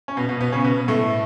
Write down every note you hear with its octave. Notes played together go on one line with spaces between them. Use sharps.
C#4
B2 B3
B2 B3
B2 B3
C#3 C#4
B2 B3
A2 A3